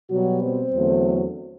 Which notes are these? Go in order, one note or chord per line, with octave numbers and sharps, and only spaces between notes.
B2 F#3 G3 F#4
C4 C5
E2 D3 F#3 A3